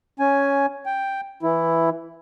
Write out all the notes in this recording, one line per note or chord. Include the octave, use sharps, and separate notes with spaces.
C#4 G#5
G5
E3 E4